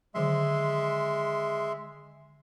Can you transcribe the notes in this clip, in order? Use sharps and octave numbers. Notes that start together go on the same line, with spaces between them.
D3 D#3 F#3 G#3 E5 C6